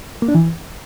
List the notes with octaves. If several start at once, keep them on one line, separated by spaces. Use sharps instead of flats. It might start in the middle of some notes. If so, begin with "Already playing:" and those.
A#3
D4
E3